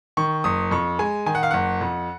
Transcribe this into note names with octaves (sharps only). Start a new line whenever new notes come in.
D#3 C#6
F#1 D#6
F2 C#6
G#3 G#5
D#3 G#5
F#5
F5
F#1 F#5
F2